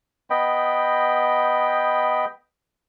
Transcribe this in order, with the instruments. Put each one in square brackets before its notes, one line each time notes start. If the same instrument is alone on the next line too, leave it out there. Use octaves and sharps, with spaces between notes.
[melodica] B3 D#5 G5 B5